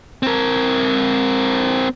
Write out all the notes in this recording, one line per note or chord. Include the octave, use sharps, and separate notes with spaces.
C4 A#4